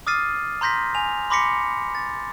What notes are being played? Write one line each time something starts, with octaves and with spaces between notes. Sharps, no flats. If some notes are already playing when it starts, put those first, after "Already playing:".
D6 D#6 F6 A6 C7 D#7
A#5 C6 G6 A#6 B6
G#5 F7
B5 C6 D6 A#6 B6 C#7
A6